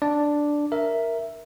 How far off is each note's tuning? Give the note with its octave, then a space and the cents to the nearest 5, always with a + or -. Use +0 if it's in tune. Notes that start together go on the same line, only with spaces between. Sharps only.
D4 +0 D5 +0
A#4 +0 E5 +0